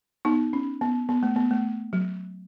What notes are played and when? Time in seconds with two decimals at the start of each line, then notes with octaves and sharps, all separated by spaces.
0.25 B3 D#4
0.53 C#4
0.81 B3
1.09 B3
1.23 A3
1.36 B3
1.51 A3
1.93 F#3